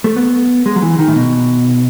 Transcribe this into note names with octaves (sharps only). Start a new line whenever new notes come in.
A3
B3
G#3
F#3
E3
D#3
A2
B2